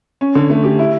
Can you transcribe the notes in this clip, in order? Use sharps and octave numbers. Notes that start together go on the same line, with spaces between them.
C#4
D3
A3
G4
E4